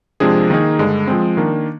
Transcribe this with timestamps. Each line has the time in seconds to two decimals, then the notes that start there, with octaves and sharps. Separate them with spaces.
0.20 C3 F3 G#3 D4 G#4
0.50 D#3 A#3 D#4 G#4
0.79 G2 D3 G#3
1.07 F3 G#3 C4
1.37 D#3 A#3 D4